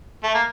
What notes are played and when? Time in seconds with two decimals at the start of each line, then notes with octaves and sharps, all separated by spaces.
0.23 A3
0.34 A#3